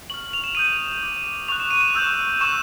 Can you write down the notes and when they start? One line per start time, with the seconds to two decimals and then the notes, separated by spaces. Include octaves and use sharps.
0.10 C#6 F6 F#7
0.33 F7
0.44 E7
0.55 D#6 G6 D#7
0.64 E7
1.03 D6 G6
1.48 C#6 F#6 F7
1.60 E7
1.71 D#7
1.81 E7
1.95 C#6 E6 G6
2.41 C#6 E6 G6 E7